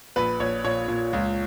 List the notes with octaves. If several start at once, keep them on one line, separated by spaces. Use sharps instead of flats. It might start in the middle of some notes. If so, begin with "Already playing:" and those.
A#1 B4
A#1 C#5
A#2 C#5
A#2
C#2